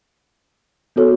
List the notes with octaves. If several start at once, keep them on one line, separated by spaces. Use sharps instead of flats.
B3 F#4 A4 C#5